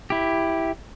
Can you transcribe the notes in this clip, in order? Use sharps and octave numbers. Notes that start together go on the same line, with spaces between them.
E4 G4